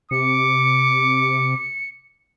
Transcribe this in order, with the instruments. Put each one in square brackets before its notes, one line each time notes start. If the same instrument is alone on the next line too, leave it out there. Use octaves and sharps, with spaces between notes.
[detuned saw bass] C3 [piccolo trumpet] D6 [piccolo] C#7